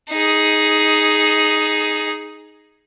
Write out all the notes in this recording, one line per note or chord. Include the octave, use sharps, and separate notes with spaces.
D#4 G#4